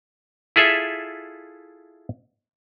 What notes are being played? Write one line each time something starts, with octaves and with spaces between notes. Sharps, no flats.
E4 F4 G#4 A4 E5